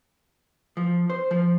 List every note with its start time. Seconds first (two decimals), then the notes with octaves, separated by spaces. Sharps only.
0.77 F3
1.10 C5
1.31 F3